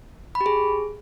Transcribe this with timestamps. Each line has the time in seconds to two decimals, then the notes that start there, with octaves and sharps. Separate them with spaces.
0.35 B5
0.41 G4
0.46 G#4